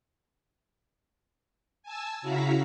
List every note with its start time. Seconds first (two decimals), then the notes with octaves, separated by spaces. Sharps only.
1.83 G#5 A5 E6
2.22 C#3 E4 F#4 F5 A#5 B6